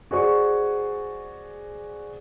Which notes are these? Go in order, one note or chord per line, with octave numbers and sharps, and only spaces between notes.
F#4 G#4 C5 D5 C#6